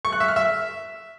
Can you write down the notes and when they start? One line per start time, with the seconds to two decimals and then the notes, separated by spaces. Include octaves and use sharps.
0.05 C#6
0.12 F#6
0.20 E5
0.28 F6
0.36 E5